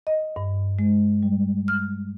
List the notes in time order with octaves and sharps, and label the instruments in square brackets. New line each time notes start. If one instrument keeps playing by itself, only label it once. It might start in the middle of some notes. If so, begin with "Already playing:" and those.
[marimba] D#5
G2
G#3
G3
F6